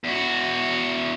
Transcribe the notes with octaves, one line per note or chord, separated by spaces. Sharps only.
E2 F#4